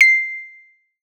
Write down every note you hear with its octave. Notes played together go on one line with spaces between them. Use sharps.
C7